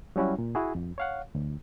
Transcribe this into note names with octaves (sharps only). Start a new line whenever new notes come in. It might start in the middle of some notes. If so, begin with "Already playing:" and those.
F#3 G3 C#4 E4 F#4
A#2
E4 F#4 G#4
F2
C#5 F5 F#5
D2